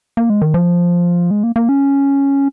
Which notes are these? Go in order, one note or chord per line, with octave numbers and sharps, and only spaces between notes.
A#3
G#3
D#3
F3
G#3
A#3
A#3
C#4